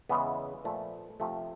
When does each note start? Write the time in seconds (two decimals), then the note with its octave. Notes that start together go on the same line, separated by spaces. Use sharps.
0.09 E2 C#3 E3 G#3 B3
0.64 A#2 F3 A3
1.20 C3 F3 A3